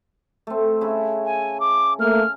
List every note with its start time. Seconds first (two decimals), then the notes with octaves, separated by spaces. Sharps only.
0.47 A3 C4
0.81 C#3 E4 C#6
1.25 G#5
1.60 D6
2.00 A3 A#3 F6